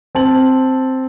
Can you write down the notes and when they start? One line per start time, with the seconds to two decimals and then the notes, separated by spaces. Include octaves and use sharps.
0.15 C4 A5 F#7